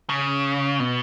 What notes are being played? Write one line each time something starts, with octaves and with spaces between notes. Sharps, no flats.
C#3
B2